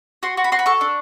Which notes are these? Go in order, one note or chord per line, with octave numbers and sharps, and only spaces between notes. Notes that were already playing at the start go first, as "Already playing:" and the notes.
F#4 C6
F#4
B5
F#4 C6
B5
A4 C#6
D4